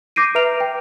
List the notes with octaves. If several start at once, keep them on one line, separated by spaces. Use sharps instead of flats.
D6 G6 A#6 C7 D7 D#7
B4 E5 A#5 F6 D7 F7
G5